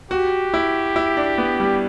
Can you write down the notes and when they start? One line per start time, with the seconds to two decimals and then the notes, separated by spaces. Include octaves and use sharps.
0.11 F#4 G4
0.54 E4
0.96 E4
1.17 D4
1.38 B3
1.60 G3